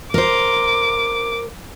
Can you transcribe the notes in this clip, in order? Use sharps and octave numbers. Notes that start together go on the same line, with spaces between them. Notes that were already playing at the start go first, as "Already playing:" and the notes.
A#4 C5 D6